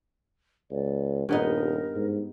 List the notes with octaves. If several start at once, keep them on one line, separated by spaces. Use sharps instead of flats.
C#2 D5
D#1 G2 B3 D#4 A#4
G#2